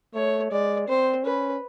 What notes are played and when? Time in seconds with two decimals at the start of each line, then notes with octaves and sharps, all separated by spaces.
0.14 A3 C#5
0.51 G#3 D5
0.88 C4 C5
1.24 C#4 B4